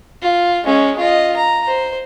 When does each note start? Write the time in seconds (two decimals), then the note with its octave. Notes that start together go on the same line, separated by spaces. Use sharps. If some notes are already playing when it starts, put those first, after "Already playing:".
0.22 F4
0.64 G#3 C#4
0.99 F4 D#5
1.37 A#5
1.67 C5